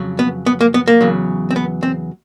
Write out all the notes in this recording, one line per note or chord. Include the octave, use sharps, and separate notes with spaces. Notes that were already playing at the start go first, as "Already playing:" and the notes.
Already playing: F2 C#3 F#3
B3
B3
A#3
B3
A#3
E2 C#3 F#3
C4
B3
C4